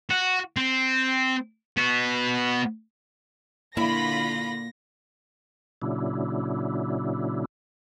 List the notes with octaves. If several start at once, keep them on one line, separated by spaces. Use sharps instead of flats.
F#4
C4
B3 F#4
D3 A#3 E4 F4 B5 A#6
A#2 C#3 F#3 D4 E4